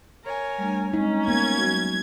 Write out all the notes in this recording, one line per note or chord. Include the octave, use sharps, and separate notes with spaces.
A#4 C#5 G#5
G3 A3 D4
G#3 C4 C#4 D#4
A#3 B3 G#6
F#3 F#4